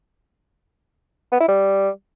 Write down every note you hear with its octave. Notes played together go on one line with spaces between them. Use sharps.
B3
E4
G3